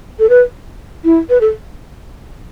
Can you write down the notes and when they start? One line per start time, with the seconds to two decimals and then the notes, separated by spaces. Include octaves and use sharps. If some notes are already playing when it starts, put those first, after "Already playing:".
0.19 A4
0.30 B4
1.04 E4
1.30 B4
1.41 A4